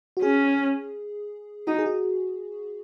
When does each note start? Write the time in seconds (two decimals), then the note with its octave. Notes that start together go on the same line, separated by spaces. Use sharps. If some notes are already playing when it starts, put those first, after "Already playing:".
0.17 F#4
0.22 C#4 G#4
1.67 D#4 F#4
1.79 G#4
1.86 F#4